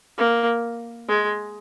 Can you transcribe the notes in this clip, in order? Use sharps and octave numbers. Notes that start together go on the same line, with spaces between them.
A#3
G#3